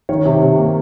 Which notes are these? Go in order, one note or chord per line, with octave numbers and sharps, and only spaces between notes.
D#3 C#5
C3
C3
A#3